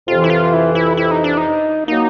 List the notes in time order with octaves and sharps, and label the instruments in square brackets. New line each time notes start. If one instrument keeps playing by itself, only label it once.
[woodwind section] F2 C3 E3 [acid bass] F4
[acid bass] E4
F4
E4
E4
E4
D#4
D4
D#4
[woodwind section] D#3 F#3 A#3 [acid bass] D#4